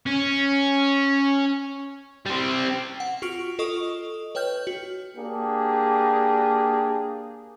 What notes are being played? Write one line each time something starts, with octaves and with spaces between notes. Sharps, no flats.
C#4
G3 C4
F#5
F4 F#4 C#6 F6 D7
F4 A4 D#5 C#6 D#6
B4 C#5 G5 F6 G6
F#4
A#3 D4 G4 G#4